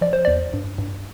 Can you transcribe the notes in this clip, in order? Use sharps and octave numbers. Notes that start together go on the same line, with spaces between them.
F3 D5
C5
E2 D5
G2
G2